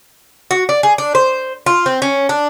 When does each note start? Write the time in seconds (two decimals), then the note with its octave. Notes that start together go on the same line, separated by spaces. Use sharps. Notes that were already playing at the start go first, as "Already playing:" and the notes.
0.51 F#4
0.69 D5
0.83 G#4
0.98 D4
1.15 C5
1.66 F4
1.86 C4
2.02 C#4
2.29 D4